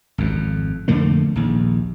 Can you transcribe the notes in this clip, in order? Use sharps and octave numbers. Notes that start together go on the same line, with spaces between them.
G#1 F2
F2 D3 A3 A#3
A#1 D#2